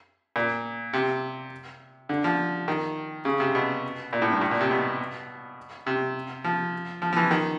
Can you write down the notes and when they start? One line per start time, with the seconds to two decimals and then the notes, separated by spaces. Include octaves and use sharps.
0.36 A#2
0.93 C3
2.09 D3
2.24 F3
2.68 D#3
3.25 C#3
3.40 C3
3.55 B2
4.13 A#2
4.22 A2
4.31 G2
4.41 A2
4.51 A#2
4.61 C3
4.71 B2
5.86 C3
6.44 F3
7.02 F3
7.13 F3
7.16 E3
7.31 D#3